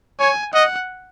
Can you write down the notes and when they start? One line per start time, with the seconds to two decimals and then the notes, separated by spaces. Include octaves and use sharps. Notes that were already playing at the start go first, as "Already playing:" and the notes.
0.20 C#5 G#5
0.53 D#5 F#5